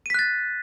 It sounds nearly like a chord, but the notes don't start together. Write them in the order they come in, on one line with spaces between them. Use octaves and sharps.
D#7 B6 F#6 A6